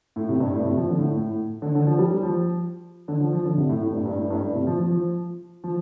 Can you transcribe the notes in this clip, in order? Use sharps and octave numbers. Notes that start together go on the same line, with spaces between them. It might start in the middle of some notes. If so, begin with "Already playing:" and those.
A2
C3
G2
A2
C3
F3
D3
A2
A2
D3
D3
F3
G3
G3
F3
D3
F3
F3
D3
C3
A2
A2
G2
G2
A2
G2
A2
C3
F3
F3
F3
F3